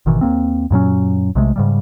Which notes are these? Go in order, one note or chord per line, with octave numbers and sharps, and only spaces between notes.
G#1 B2 D#3 E3
D#2 A#2 A#3 C4
F#2 A#2 F#3 C#4
B1 C3 G#3 A3
G#2 C#3 G3